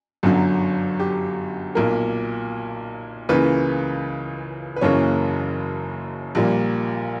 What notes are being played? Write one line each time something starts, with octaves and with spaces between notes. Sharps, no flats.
G1 F#2 D3 F#3
G4
B1 A#2 A#3 A#4
C#2 C#3 E3 A#3 B4
B4
F#1 F#2 C#3 E3 A#3 C#5
A#1 A#2 G3 A#3